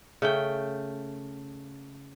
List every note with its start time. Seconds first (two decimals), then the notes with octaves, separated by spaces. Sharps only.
0.22 C#3 A3 G5